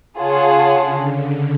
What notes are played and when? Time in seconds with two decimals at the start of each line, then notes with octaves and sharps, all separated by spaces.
0.18 C#3 F4 G#4 C#5 F#5 A5
0.73 D3